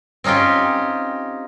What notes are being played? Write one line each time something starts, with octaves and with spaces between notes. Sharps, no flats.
C4 C#4 D#4 F4 G4